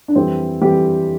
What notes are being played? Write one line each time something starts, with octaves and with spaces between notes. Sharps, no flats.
D4
F2 E3 G3 C4
F2 E3 G3 G4